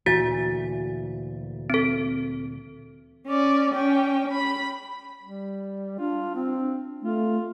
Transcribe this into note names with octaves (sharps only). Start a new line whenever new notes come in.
D2 A#2 E3 F#4 A6
C4 A4
C#4 D5
C#4 G5
B5
G3
D4 F4
C4
A3 F4